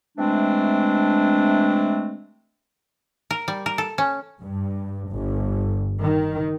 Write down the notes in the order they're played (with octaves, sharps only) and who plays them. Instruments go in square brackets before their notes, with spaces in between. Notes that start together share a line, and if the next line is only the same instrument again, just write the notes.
[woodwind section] C3 E3 G#3 A3 C4 D4
[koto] A#4
G3
A#4
A4
C#4
[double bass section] G2
G1
D#3